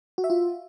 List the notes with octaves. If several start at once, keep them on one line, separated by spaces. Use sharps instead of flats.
F#4
E5
F4